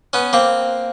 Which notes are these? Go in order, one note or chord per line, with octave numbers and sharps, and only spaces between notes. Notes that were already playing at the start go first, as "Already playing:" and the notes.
B3 C#4
A#3 C4